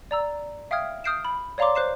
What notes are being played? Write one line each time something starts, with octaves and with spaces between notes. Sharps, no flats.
D5 A#5 E6
E5 F5 G5 D#6 F6 G#6
D#6 F6 G6 C7 D7 E7
B5
C#5 D5 F5 A#5 C6 D6
C5 F#6 C7 E7